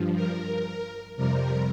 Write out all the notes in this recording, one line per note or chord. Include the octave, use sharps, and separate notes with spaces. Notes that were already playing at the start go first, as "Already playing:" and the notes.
Already playing: G2 F3
A#4
F2 C3 G3 A#4